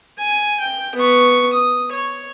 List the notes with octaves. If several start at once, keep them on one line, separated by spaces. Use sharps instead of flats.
G#5
G5
B3 C#6
D#6
C#5